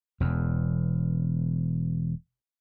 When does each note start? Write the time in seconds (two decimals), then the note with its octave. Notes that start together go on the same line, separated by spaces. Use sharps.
0.20 E1 E2